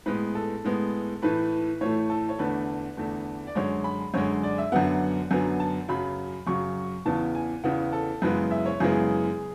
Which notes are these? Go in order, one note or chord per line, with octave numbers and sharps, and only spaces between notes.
A2 G#3 B3 B4
A4
A2 G#3 B3
A2 E3 A3 B4
A2 E3 A3 C#5
A4
C#5
E2 D3 A3 B4
E2 D3 A3
D5
F#2 D3 G#3 C#5
B5
F#2 D3 G#3 C#5
D5
E5
F#2 D3 F#3 B3 F#5
F#2 D3 F#3 B3 G#5
A5
F#2 C#3 F#3 B5
F#2 C#3 F#3 C#6
E2 C#3 E3 B3 A5
G#5
E2 C#3 E3 B3 F#5
A4
F#2 C#3 E3 G#3 B3 B4
E5
C#5
F#2 C#3 E3 G#3 B3 G#4